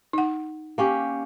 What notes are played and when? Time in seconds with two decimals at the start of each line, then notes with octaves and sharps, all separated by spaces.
0.13 D#4 F#5
0.78 A#3 C#4 G4